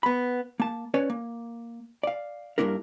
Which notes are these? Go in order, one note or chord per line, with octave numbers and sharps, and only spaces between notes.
B3 B5
A#3 A5
C#4 B4 C#5 D5
A#3
D5 F5
G2 E3 A#3 D4 E4 A#4